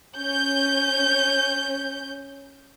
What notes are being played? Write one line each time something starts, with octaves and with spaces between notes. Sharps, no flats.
C#4 G6